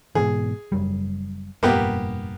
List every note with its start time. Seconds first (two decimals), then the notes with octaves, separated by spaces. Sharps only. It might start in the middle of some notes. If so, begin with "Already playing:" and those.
0.15 G#2 B2 E3 G#4
0.72 F#1 F#2 G3
1.63 F1 G2 A#2 A#3 B3 G4